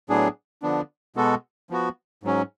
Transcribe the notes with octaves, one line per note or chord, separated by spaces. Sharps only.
A2 F#3 B3 D4 G#4
D3 F3 B3 D4
B2 G#3 B3 F#4 A4
F3 B3 F#4
G#2 F#3 C#4